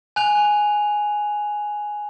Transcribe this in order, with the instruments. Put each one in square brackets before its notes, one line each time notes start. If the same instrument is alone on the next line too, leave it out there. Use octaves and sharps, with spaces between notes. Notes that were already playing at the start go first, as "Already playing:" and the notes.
[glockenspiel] G#5 F#6 F7